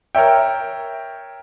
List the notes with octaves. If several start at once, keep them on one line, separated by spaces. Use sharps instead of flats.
A#4 C#5 E5 G5